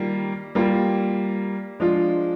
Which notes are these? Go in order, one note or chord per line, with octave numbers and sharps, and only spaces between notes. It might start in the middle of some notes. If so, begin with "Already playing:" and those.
Already playing: D#3 G3 A#3 F4
G3 A#3 F4
F3 G#3 D4 F4